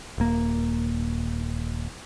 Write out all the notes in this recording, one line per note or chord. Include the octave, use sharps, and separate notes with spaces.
D#1 A#3